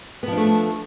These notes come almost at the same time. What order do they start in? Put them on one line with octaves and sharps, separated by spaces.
B3 F3 D4 A3